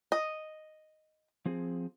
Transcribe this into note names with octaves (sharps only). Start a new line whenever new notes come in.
D#5
F3 C4 G#4